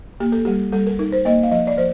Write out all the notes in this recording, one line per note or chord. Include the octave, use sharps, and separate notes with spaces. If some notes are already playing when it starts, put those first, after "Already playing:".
A#3 G4
A4
G3 G4
G3 A4
A#4
D#4 A#4
C5
A#3 D#5
F5
F3 D#5
D5
F3 C5